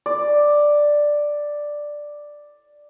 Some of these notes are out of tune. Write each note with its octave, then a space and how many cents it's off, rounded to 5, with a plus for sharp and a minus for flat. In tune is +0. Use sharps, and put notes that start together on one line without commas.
D5 +5